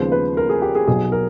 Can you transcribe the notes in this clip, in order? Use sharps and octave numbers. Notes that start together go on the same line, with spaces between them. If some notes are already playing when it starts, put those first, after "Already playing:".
Already playing: D#2 C#3 F3 G#3 B3 C5
B4
A#4
G#4
G4
G#4
B1 B2 F#3 G#4
A#4